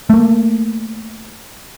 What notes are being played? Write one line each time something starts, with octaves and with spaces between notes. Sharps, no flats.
A3 A#3